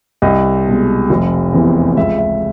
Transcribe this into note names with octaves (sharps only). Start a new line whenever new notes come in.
C2 D#5
B2 G#3
F1
E2 C3 E3
C#2 E5
E5